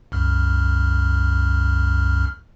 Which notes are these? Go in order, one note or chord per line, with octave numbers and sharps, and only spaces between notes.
C2 F#2 F6